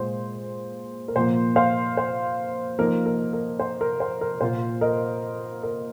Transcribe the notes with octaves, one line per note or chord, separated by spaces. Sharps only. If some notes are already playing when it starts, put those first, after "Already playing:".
Already playing: A#2 G#3 F4 C5
A#4
A#2 F3 A#3 C5
C5 F5
C5
F3 A#3 D#4 A#4
A#4
A#4
C5
A#4
C5
A#4
A#2 A#3 F4 C5
A#4 D#5
A#4